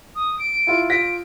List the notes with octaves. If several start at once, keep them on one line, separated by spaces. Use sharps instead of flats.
D#6
D7
E4 F4
F4 A#6 B6 D7